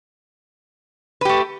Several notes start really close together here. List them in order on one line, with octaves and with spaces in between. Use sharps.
B4 G4 A3